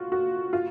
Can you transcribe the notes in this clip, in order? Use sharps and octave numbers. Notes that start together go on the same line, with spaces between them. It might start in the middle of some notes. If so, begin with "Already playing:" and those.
Already playing: F4 F#4
F#4
F4